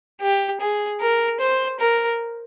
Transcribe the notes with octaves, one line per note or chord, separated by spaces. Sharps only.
G4
G#4
A#4
C5
A#4